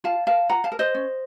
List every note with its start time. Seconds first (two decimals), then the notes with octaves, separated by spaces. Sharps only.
0.04 F4 F5 A5
0.27 A#4 F5 A5
0.49 F4 F#5 A#5
0.64 F5 A5
0.72 A#4
0.79 C5 D#5
0.95 C#4